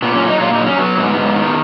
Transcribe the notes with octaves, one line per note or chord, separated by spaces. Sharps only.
A#2 B3
C#4
F#3
D#4
A#2 F4
D#4
F#3
C#4
F#3 B3
G#2 B3
G#2
D#3